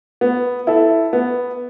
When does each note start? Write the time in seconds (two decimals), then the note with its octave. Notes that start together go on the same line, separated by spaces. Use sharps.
0.21 B3
0.67 E4 A4
1.13 B3